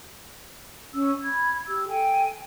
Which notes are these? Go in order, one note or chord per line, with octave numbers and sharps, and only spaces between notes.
C#4 E6
B5 G#6
G4 E6
A4 G5 G#5